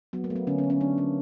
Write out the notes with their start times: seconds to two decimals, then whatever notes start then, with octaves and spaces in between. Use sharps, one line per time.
0.13 F#3 B3
0.24 A#3
0.30 A3
0.36 B3
0.47 D3 C#4
0.58 C#4
0.64 D3
0.70 C#4
0.81 F#3 D4
0.98 A#3